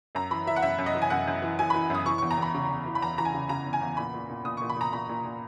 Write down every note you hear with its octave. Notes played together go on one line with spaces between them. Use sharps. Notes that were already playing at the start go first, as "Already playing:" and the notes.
F#2 A#5
E3 B5
E3 E5
F#5
F#2 E5
F#2
D#5
E3
G#5
F#2 F#5
F#2
E3
E3 G#5
B5
E3
F#2 D#6
E3 C#6
C#6
E2
A#5
E2 B5
C#3
E2
E3
B5
E2 A#5
E3 A#5
G#5
C#3
C#3 A#5
E2
G#5
E2
A#2 B5
A#2
A#2
A#2 D#6
C#6
A#2
B5
A#2 A#5
A#2 B5
A#2
A#2